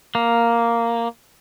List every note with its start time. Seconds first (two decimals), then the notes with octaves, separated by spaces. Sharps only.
0.15 A#3